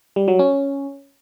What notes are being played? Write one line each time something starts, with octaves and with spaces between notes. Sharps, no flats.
G3
F#3
C#4